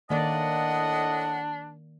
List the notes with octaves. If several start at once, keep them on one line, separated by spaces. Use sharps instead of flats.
A2 D#3 A#3 D4 D5 D#5 F#5